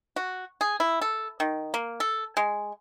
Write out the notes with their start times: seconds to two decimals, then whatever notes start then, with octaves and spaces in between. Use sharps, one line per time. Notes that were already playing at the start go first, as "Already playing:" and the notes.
0.16 F#4
0.61 G#4
0.80 E4
1.01 A4
1.40 D#3
1.74 A#3
2.00 A4
2.37 G#3